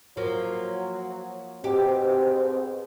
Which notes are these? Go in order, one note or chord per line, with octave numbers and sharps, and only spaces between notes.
F3 F#3 A#3
G#2 B2 C4 G4